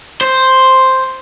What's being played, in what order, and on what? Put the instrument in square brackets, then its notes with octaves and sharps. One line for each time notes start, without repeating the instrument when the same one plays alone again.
[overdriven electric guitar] C5